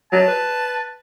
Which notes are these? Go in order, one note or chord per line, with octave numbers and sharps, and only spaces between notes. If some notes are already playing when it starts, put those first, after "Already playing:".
F#3 A5
B4